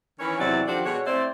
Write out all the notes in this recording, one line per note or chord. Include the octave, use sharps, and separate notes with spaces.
D#3 E3 C#4 C#5
E2 C3 F#3 C4 E4 D5
D#3 F3 D4 F#4 G4 A4
B2 G#3 F#4 C#5
A3 C4 E4 C5 D5